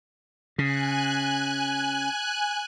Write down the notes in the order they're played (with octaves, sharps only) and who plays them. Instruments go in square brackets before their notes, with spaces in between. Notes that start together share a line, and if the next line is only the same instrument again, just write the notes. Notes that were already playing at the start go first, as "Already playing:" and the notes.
[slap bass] C#3 [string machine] G#5 F#6